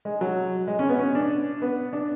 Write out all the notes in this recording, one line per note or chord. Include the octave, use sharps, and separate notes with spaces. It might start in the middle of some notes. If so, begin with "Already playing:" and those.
G#3
F#3
G#3
C#4
B3
C#4
D4
B3
D4